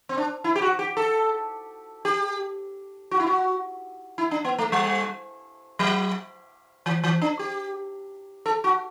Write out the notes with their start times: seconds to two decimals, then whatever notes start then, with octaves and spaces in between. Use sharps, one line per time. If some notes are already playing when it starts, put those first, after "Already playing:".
0.09 C4
0.17 D4
0.44 E4
0.56 G4
0.62 F#4
0.79 G4
0.97 A4
2.05 G4
3.11 F#4
3.20 E4
3.27 F#4
4.18 E4
4.31 D4
4.45 B3
4.58 A3
4.72 G3
5.79 F#3
6.86 E3
7.04 E3
7.22 D4
7.39 G4
8.46 A4
8.64 F#4